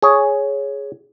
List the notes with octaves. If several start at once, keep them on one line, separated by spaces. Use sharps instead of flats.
G#4 C#5